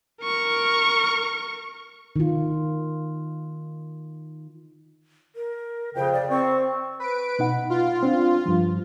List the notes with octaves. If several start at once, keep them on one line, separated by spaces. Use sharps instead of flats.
A#4 C#6
D#3 F4
A#4
F2 C#3 G5
D5
C4 C#6
B4 D7
B2 D#4 F#5
F4
C4 D4
G2 F3